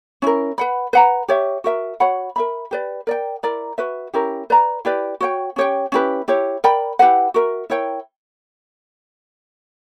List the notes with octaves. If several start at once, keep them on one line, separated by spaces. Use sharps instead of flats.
C#4 E4 A#4
B4 F#5 B5
B4 F#5 A#5
G4 C#5 E5
F#4 A#4 E5
F#4 C#5 F#5 B5
A#4 E5 B5
G4 B4 D5
A#4 D5 G5
E4 A#4 D5 A#5
F#4 B4 E5
C#4 E4 G4 A#4
B4 D5 A#5
E4 G4 B4 D5
F#4 C#5 G5
C#4 G4 C#5 G5
C#4 E4 G4 B4
E4 G4 C#5
A#4 D5 G5 B5
E4 G4 B4 F#5
F#4 A#4 E5
E4 A#4 C#5 G5